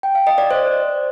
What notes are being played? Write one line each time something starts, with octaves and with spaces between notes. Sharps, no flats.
G5
F5
D#5
D5
C5